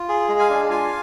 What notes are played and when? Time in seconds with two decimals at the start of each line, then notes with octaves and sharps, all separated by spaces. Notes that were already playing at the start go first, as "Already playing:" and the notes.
Already playing: F4
0.09 G#4
0.29 G#3
0.39 F5 G#5
0.50 D4
0.70 F4 F5 G#5